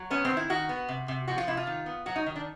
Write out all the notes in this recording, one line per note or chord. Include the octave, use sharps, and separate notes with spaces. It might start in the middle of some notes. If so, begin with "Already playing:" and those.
Already playing: F#3
B3 C#4
C4
D#3
E4
D#3 F#4
B3
C3
C3
F3 F#4
F4
C3 E4
F4
D#3
B3
F#3 F#4
D#4
D#3
D4